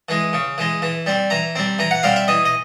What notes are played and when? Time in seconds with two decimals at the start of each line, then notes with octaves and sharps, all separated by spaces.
0.09 E3 G#3
0.33 C#3
0.58 E3 G#3
0.82 E3
1.06 G3 C4
1.30 E3 A#5
1.56 G3 C4
1.79 E3 A#5
1.91 F#5
2.03 G3 C4 F5
2.16 E5
2.28 E3 D#5
2.45 D#5